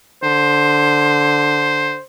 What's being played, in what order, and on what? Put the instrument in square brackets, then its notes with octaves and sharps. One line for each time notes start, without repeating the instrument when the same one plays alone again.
[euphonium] D3 [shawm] C5